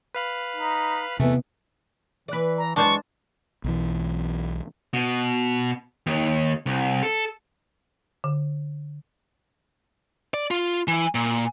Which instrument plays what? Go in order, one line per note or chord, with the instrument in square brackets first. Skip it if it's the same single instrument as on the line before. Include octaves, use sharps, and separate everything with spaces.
[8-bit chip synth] B4 F5 B5
[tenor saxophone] D#4
[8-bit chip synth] E2 A3 [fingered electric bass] C3 B3 [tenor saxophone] E3
[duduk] E3 [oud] B4 D5
[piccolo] A#5
[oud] F#2 E3 [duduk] G#3 [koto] D4 C5 A5 [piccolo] C#6
[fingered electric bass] B1 E3
[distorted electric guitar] B2
D#2
C2
A4
[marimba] D3
[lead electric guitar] D5
F4
E3
A#2